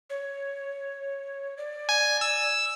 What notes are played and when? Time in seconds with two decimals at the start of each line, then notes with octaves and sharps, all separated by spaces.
0.10 C#5
1.57 D5
1.89 G#5
2.21 E6